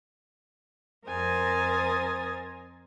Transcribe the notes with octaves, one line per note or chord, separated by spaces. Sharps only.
F2 A#4 C5 G#5 D#6 A6